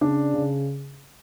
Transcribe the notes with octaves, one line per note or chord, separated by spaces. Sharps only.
C#3 D4 D5
C#3